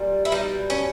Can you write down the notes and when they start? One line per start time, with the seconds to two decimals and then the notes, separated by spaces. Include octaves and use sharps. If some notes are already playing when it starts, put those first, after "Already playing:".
Already playing: A#2 G3
0.25 E4
0.32 B2 G3 D#4
0.70 C#4